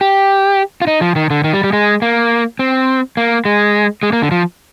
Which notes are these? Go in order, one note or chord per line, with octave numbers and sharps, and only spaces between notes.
G4
F4
D#4
F3
D#3
D3
D#3
G3
G3
G#3
A#3
C4
A#3
G#3
G#3
A#3
D3
F3